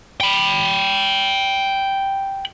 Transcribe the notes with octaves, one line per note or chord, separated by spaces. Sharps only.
G5 B5